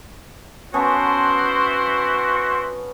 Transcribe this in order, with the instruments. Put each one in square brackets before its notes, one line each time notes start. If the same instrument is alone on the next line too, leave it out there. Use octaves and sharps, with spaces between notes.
[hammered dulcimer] B3 C#4 A5 [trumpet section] E4 C5 [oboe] F#4